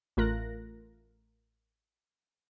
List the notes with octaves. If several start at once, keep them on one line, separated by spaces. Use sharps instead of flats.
A1 A3 F4 A#4 F#6 A#6